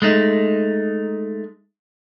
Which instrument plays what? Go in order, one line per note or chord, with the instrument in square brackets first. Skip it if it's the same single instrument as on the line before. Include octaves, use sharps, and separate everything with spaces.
[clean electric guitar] G#3 A3 D#4